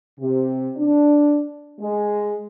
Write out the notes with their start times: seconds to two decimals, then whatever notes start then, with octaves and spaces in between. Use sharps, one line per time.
0.20 C3
0.77 D4
1.80 G#3